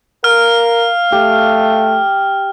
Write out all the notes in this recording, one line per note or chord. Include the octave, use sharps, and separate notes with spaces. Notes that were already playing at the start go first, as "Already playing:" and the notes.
A#4 F5 F6
A3 G4